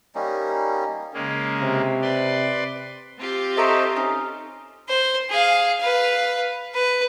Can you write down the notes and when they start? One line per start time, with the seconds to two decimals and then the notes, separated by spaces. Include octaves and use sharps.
0.15 G3 A#3 C#4 D#4
1.14 C#3 G#3 A#3
1.61 C3
2.02 B4 D5 C6
3.19 C4 F4 G4
3.57 A4 C5 D#5 E5 A#5 C#6
3.96 C#4 D#4
4.89 C5
5.30 G#4 F5
5.80 B4 F5
6.74 B4